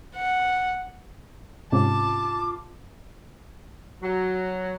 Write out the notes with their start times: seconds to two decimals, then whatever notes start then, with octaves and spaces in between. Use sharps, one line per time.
0.16 F#5
1.72 G#2 C3 C#4 F4 A5 D6
4.03 F#3